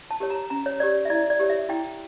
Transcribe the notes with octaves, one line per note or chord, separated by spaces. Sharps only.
A5
G4 A#4 C#5
A#5
C#4 A#5
C#5
G4 A#4 C#5 D5
E5
E4 D5
D5
G4 A#4 C#5
E5
E4 G5